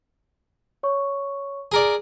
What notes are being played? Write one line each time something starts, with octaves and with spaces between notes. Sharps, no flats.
C#5 C#6
G#4 A#4 D5